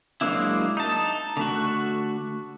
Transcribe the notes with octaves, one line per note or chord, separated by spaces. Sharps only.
F#3 G#3 A#3 D4 E4
D#4 A5
D3 A3 F#4